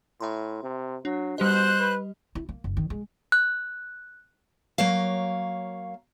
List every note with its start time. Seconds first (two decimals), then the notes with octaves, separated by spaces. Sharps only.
0.21 A2 E5 A#5 C6
0.63 C3
1.05 F#3 D4
1.38 B2 G3 G4 C5 D#5 F#6
1.80 B4
2.35 E4
2.49 A#3
2.64 F#1
2.77 D#3
2.90 G#3
3.32 F#6
4.78 F#3 A#3 C#5 F5